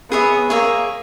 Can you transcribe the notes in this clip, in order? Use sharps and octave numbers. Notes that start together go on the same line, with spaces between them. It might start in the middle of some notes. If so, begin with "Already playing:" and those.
B3 G#4 C#5 E5
A#3 G#4 C#5 E5